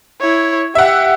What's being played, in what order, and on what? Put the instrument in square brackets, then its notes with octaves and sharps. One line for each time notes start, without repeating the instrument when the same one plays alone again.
[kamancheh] E4 C#5
[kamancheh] G4 [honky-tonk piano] E5 F#5